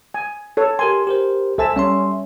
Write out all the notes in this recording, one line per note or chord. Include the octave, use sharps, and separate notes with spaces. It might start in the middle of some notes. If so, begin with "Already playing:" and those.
G#5
A4 C#5
G4 A#4 G#5 C6
G4 A#4 C5
C2 A4 C5 E5 G#5 A5
G3 C#4 E5 C6